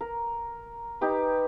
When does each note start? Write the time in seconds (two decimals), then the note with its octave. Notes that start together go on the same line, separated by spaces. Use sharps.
0.01 A#4
1.01 D#4 G4 B4